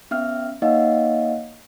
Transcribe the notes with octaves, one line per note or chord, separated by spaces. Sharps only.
B3 C#4 E5 F6
A#3 D#4 C#5 D#5 F5 F#5